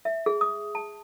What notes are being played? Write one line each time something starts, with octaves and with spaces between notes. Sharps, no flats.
E5
G#4
D#6
A5